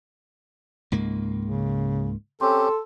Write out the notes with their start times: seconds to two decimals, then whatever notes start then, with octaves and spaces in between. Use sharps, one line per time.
0.92 C#2 G#2 A#3
1.45 C#3
2.41 C4 C#4 G4 A4 C6